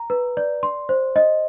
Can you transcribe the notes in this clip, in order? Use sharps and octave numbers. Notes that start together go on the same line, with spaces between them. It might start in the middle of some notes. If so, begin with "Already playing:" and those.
Already playing: A#5
B4
D5
C6
C5
D#5